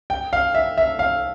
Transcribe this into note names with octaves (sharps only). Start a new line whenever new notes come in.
G5
F5
E5
E5
F5